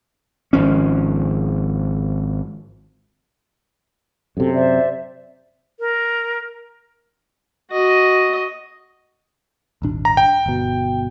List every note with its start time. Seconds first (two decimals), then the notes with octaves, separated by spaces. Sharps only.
0.53 G#1 F3 C#4
4.37 F#2 C3 A4
4.54 C5 D5 E5
5.80 A#4
7.71 F#4 D#5
9.82 D#1 G#1 D4
10.05 A#5
10.17 G5
10.46 G1 B2